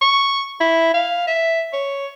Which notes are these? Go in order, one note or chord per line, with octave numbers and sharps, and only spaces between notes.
C#6
E4
F5
E5
C#5